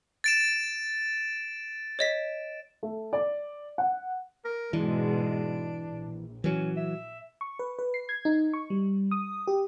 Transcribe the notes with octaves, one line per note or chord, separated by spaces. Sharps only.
A6 D7 E7
C#5 D#5 B6
A3
D5
F#5
A#4
G#2 B2 E3 G#3 D4
A#1
E3 F#3 C#4
E5
C#6
B4
B4
C7
G#6
D#4
C#6
G3
D#6
G4